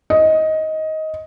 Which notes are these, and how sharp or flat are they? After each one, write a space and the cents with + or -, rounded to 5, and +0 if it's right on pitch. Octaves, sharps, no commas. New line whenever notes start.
D#5 +15